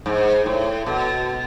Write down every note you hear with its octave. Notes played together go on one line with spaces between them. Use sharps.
G#2
A2
B2